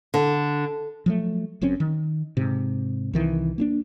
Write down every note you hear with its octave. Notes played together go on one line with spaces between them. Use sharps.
D3
F3 F#3 A3
F#1 F#2 C4 C#4
D#3
G#2 C3
C2 D#3 E3
A#3 C4 D4